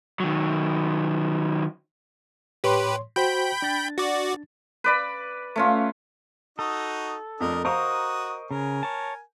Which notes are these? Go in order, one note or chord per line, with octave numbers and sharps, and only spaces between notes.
D#3 F#3
A2 G4 B4 C#5 C6
F#4 C5 G5 B5 G6
D4 A6
F#4 D5
B4 D5 B5
A3 C#4 F4
D#4 F#4 A4 D#6
F2 F3 A3 D4 A#4 D#5
F#4 A#4 C5 D#5 F5 A#5 C#6 D#6
C#3 A#4 G#5
C#5 A5